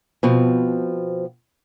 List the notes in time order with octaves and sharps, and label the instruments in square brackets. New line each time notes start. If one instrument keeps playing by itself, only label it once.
[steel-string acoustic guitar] B2 F3 C4